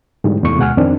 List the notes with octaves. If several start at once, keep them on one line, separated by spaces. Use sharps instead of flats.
G#2 D3 E3 G3
E2 C3 A3 C#6
D2 B2 G#3 F#5 G#5 F6
F2 D#3 C4 D4